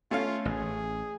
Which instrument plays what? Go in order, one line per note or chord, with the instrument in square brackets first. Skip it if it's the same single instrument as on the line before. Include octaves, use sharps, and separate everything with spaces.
[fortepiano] A3 C#4 F5 [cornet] F4
[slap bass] A1 [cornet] G#4